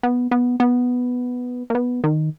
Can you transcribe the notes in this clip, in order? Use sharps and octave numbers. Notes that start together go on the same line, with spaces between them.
B3
B3
B3
A#3
B3
D#3